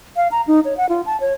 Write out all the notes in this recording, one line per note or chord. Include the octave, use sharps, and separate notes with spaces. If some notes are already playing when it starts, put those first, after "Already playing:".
F5
A#5
D#4
C#5
F#5
F4
A5
C#5